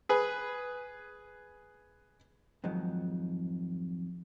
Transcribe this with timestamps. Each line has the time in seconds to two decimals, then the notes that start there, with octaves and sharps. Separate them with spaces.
0.09 G#4 B4
2.64 F2 G#2 D#3 F#3